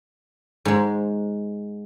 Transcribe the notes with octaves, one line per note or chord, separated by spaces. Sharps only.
G#2 G#3